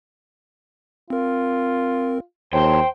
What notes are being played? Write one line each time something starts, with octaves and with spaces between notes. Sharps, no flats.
C4 F4 A#4
D#2 C5 C#5 G5 A5 C6